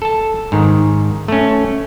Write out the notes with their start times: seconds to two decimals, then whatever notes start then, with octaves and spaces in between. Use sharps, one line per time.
0.02 A4 A5
0.52 G#2 D#3
1.28 A3 C#4